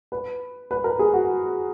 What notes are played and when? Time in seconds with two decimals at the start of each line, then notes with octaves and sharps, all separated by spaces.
0.12 B4
0.71 B4
0.84 A#4
0.99 G#4
1.13 F#4